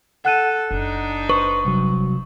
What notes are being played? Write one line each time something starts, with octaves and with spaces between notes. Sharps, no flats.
A4 F#5 F#6 D#7
F#1 D4 D#4
B4 C5 C#6
C2 F#3